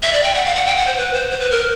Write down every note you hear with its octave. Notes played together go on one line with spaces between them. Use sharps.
E5
D5
G5
F#5
F5
F#5
G5
F#5
C5
B4
C5
C5
B4
A#4